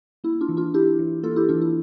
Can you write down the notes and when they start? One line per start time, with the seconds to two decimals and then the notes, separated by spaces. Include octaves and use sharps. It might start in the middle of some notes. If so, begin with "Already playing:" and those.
0.24 A#3 E4
0.41 D4 F4
0.49 E3
0.57 D4 F4
0.74 D4 E4 G4
0.99 E3
1.23 A#3 F4 A4
1.36 E4 G4
1.49 E3 D4 F4
1.62 E4